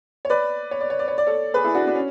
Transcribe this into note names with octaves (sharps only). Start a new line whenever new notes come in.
C#5
B4 D5
C#5
D5
C#5
D5
C#5
D5
A4 C#5
G#4 B4
E4 G#4
D4 F#4
D4
C#4